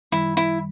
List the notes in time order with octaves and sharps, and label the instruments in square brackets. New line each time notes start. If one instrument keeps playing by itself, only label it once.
[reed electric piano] F#2 D#3 G3 [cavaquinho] E4
[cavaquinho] E4